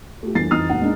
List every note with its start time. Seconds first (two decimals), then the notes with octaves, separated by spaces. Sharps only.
0.23 A3 F4 G4
0.35 D#1 E3 A3 D4 A6 C7
0.51 F2 E3 D#4 D#6 F6 C7
0.69 E1 A#2 D#4 F#5
0.81 G#3 A#3 D4 D#4